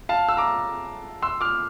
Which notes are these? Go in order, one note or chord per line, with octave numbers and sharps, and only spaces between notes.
F5 A5
E6
A#5 D6
C6 E6
D6 F6